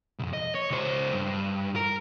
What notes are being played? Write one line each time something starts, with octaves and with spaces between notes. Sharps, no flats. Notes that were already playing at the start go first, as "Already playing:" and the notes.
C2 F2
D#5
C#5
C#2 C5
G2
A#4